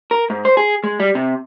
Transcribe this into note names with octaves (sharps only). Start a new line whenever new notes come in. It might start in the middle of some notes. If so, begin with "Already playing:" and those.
A#4
G#2
C5
G#4
G#3
G3
C3